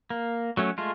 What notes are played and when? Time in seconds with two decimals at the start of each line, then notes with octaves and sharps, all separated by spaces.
0.10 A#3
0.57 F#3 A3 C#4
0.78 G#3 A3 F4